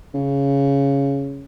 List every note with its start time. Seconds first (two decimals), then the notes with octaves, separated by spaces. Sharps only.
0.14 C#3